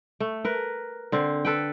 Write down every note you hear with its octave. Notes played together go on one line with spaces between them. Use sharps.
A3
A#4 B4
D3 C4
A4 B4 G5